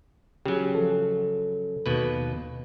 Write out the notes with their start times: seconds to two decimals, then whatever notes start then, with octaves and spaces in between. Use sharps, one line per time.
0.46 C#3 F#3 G4 G#4
0.75 F3 A4
1.86 D#2 B2 B4